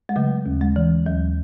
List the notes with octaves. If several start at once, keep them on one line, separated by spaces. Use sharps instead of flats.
G#3
C#3 F#3 A3
D#2
G#3
E3
D#2 F#3